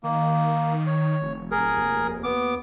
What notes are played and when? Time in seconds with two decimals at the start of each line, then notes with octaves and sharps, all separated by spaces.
0.03 D#3 A#3
0.87 C#5
1.22 F1
1.51 D1 G#4 A#4
1.76 F1 D#2
2.23 B3 D6